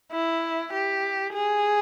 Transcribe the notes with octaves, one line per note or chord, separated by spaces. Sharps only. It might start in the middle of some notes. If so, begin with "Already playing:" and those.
E4
G4
G#4